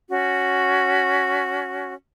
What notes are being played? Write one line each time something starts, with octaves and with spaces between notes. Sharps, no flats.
C#4 F#4